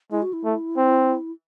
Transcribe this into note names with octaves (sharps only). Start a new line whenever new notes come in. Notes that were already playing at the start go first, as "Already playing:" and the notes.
G#3 E4
F#4
E4
A3
C4